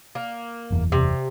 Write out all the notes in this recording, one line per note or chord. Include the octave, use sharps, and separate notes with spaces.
A#3
F#1 E2
C3